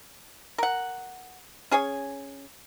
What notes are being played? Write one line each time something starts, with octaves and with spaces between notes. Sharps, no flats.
A#4 F#5
C#4 G#4 C#5 G#5